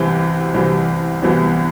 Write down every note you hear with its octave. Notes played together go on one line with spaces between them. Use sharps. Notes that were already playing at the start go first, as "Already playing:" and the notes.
Already playing: C2 C3 E3
C2 C3 E3
C2 C3 E3 B3